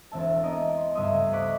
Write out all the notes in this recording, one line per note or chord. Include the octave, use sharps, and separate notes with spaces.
E1 C4 E5 A5
B3 A#4 D#5
C6
C#2 G2 A3 E5 C6 D#6
C5 D#5 C#6 D6 F#6 B6